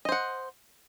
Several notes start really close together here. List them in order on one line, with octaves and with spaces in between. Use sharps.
D#5 C5 F#5